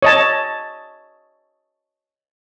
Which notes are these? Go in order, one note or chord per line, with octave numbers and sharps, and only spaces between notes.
C#5 D#5 A5